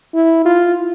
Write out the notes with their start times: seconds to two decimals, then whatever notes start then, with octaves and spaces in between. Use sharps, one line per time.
0.14 E4
0.45 F4